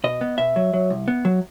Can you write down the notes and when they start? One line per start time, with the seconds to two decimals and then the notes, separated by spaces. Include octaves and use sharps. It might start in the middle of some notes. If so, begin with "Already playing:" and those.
0.04 B2 D#5
0.21 B3
0.38 B2 E5
0.56 F#3
0.74 F#3
0.90 C2
1.08 B3
1.25 F#3